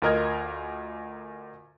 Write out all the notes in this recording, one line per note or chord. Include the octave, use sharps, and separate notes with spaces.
D2 F4 A#4 D#5 F6 G#6